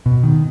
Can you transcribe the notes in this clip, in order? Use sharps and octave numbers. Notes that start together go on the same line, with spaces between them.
B2
D#3